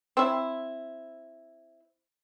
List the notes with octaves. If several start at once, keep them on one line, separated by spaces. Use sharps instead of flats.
C4 E4